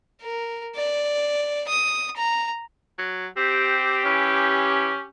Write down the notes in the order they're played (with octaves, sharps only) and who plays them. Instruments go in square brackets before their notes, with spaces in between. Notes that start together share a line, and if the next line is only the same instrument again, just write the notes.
[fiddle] A#4
D5
D#6
A#5
[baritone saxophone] F#3
[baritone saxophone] C4 [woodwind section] G4
[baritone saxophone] E3 [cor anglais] C#4